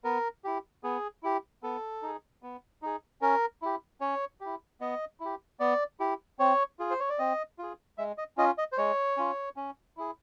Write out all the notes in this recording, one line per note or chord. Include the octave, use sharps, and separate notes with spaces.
B3 A#4
E4 G4
B3 G#4
E4 G4
B3 A4
D#4 G#4
B3
D#4 G#4
C#4 A#4
E4 G4
C#4 C#5
E4 G4
B3 D#5
E4
G4
B3 D5
E4 G4
C4 C#5
F4 G#4
C5
C#5
D5
C4 D#5
F4 G#4
G#3 E5
D#5
C#4 F4 D#5
D#5
C5
G#3 C#5
C#4 F4
C#4
E4 G#4